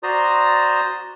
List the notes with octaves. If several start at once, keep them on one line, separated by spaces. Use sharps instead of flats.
F#4 C5 D5 A#5 C6 D#6